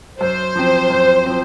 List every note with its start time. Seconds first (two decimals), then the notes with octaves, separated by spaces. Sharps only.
0.20 F#2 C5
0.56 F3 C4
0.90 F#2
1.26 F3 C4